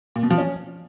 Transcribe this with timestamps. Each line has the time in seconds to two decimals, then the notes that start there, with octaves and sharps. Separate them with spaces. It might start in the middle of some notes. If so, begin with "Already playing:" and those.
0.16 A#2
0.23 B2
0.31 F3
0.38 C#4